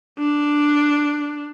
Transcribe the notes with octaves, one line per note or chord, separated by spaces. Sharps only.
D4